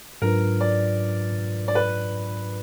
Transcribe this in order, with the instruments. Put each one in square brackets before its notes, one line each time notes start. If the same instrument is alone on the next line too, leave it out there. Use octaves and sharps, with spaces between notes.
[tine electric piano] G#2 F#3 D4 F4 B4 [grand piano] A#4
[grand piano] D5
D5
B4